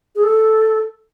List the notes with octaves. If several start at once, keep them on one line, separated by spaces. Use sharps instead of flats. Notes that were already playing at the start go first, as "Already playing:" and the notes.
G#4
A4